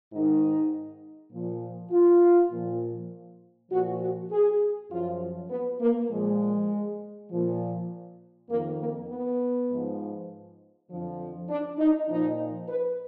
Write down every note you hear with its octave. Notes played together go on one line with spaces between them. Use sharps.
G#2 D#3 D#4
A#2 F3
F4
A#2 F3
A#2 F3 F#4
F#4
G#4
F#2 F3 F4
B3
A#3
A#2 F3 G#3
A#2 F3
F2 D#3 A#3
A#3
B3
G#2 F3
F2 D3 F3
D4
D#4
A#2 F3 D#4
B4